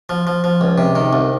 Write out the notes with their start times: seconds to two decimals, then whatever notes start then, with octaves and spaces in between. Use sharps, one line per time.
0.09 F3
0.27 F3
0.44 F3
0.61 C#2
0.78 C3
0.95 D#3
1.13 C2